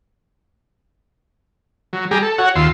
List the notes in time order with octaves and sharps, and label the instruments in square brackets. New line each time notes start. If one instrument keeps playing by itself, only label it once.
[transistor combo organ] F#3
G3 G4 G#4 A#5
A4
F#4 C#5 F#5
D#2 F4 C6 E6